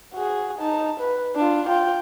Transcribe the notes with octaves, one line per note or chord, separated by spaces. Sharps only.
F#4 G#4
D#4 A5
B4
D4 F4
F4 G5